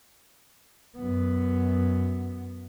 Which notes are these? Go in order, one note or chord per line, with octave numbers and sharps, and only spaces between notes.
F#2 B3